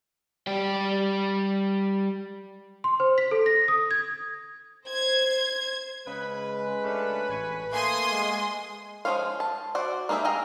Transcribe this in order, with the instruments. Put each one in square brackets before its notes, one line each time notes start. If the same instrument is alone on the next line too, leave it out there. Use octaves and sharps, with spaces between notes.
[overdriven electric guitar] G3 G5
[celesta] C6
C5
B6
A4
A#6
D#6
G#6
[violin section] C5 G#6
[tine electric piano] C#3 [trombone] G#3 [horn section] B4
[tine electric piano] A3 C#4 D4
A1 G#5 C#6
[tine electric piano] A3 A#3 [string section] G#5 C6 D#6
[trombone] G#3
[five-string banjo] F3 G#3 C#4 C5 F5
A5
F#4 C5 D5
A#3 D#4 G#4 B4 E5
G#4 F5 G5 A#5